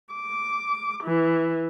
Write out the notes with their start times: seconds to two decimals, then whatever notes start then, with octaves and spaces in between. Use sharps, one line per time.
0.14 D6
1.04 E3